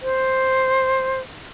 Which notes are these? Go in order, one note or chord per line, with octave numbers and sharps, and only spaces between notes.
C5